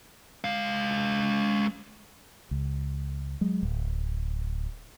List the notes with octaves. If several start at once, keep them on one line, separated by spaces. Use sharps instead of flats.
G#3 F5
C#2
F#3 G#3
D1